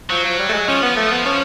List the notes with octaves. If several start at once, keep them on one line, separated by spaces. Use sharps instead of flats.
F3 F#3
F3
G3
A3
G#3
F3 C#4
B3
A3
B3
C#4